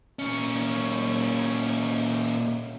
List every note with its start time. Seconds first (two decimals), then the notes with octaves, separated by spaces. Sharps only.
0.19 A#2 C#4